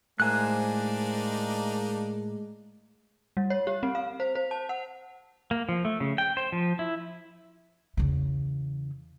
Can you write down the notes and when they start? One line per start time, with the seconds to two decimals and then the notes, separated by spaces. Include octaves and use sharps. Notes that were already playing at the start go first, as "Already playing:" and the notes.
0.20 A2 G#3 A#3 D4 D#4 C5 G#5 F#6
3.37 G3
3.50 C#5
3.67 G4
3.83 C4
3.95 F5
4.20 C5
4.35 C5
4.51 A5
4.69 F#5
5.51 A#3
5.69 F3
5.85 A3
6.00 C#3
6.18 G5
6.37 C5
6.52 F3
6.79 E4
7.97 E2 C#3